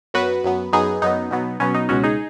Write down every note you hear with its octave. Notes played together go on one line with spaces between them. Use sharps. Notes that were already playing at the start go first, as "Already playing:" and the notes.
F#2 F#3 B3 F#4 B4
F#2 F#3 B3
F#2 F#3 B3 D#4 G#4
F#2 F#3 B3 D#4
B2 F#3 B3
B2 F#3 B3 C#4
D#4
C#2 B2 G#3 C#4 F#4
D#4 G#4